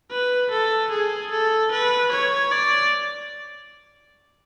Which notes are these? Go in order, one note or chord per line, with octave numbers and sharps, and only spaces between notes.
B4
A4
G#4
A4
B4
C#5
D5